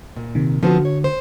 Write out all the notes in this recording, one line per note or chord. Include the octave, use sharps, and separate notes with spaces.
A#2
C3 D#3
D3 F3 B3 C4 F#4
C#5
C5